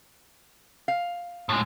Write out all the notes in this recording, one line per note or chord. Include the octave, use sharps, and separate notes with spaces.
F5
A2 G#3